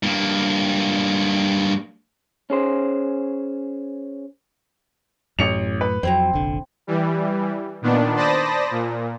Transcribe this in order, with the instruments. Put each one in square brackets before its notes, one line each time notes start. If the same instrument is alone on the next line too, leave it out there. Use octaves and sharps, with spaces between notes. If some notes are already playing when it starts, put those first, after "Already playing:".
[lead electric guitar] G2 A#3
[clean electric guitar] C#4 G#4 C5
[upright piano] A1 C#7 F7 [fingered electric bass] F#2 A2
[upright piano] B4
[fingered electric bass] F2 F#3 [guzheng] C4 E4 A#5 [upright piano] C5
[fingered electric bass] F1 A#1 D3
[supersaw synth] E3 G3
A#2 D#3 B3 D4
C5 D5 A5 B5 D#6 A#6
A#2